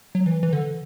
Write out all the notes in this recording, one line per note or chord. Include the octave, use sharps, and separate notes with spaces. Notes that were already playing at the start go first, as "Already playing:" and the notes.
F#3
E3
E3
D3